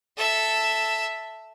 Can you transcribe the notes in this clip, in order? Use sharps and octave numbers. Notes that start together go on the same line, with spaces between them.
A4 E5